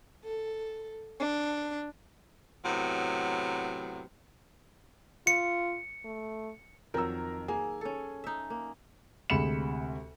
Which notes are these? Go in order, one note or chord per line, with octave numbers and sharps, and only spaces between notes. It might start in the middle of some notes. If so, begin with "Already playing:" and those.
A4
D4
A2 C3 F#3 B3
F4 C#7
A3
F2 D#3 F#3 A#4 A#5 E6
A#3 G#4 G#5
C#4 A4
D#4 E5
A#3
D2 C3 G#3 B5 C#7 E7